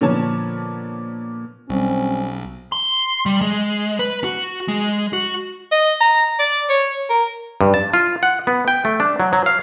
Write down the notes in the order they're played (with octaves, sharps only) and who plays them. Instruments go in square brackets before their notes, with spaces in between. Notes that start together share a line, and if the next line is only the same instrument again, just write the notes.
[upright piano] A#2 D3 F3 B3 C#5 A5
[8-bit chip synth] B1 [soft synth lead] G3 [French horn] C4 [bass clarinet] C#4
[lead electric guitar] C6
G3
G#3
B4
F#4
G#3
F#4
[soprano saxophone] D#5
A#5
D5
C#5
A#4
[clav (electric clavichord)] G2
A5
F4
F#5
B3
G5
A3
D4
F#3
F#3
F5